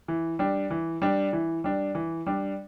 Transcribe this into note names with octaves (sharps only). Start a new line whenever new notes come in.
E3
G3 D4
E3
G3 D4
E3
G3 D4
E3
G3 D4